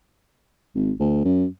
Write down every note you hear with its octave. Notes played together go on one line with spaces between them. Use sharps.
G#1
D2
F#2